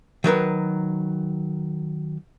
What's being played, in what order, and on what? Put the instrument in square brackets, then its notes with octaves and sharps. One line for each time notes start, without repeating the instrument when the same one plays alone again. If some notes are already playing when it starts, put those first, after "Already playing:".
[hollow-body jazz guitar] D#3 F#3 A#4 B4